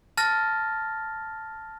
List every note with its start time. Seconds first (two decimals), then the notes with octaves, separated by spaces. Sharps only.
0.17 A5 F6 A6 A#6